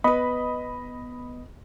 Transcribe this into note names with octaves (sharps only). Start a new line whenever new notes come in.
B3 B4 D#5 B5 D#6